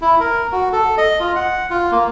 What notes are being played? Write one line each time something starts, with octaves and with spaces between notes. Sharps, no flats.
E4
A#4
F#4
A4
D#5
F4
F#5
F4
A#3